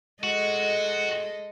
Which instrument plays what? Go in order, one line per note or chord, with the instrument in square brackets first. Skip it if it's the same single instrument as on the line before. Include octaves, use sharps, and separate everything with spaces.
[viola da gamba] G#3 A4 D#5 [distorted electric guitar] F#4